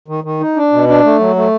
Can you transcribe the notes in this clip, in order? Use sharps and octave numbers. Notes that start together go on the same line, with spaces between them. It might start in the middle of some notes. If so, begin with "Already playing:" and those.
D#3
D#3
D#4
D4
B2
D4
A3
F#3
A3